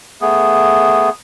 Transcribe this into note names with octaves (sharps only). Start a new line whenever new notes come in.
A3 B3 G#4